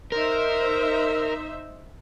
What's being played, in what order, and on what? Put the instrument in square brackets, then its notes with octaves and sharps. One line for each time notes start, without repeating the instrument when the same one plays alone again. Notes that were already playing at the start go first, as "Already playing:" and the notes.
[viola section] D#4 C5 E5 [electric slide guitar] A#4